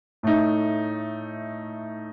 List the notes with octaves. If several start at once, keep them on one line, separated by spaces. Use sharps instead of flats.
A2 A3 D#4